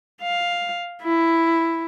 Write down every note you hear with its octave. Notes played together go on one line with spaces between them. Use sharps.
F5
E4